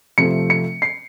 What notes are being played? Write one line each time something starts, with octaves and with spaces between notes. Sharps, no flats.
C3 F3 A3 C#7
C#7
C7